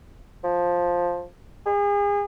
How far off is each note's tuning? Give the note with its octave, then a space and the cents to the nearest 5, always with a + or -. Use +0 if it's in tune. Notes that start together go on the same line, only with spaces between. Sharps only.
F3 +10
G#4 -35